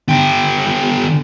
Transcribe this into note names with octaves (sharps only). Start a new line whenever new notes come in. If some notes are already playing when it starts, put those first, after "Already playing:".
D3 G4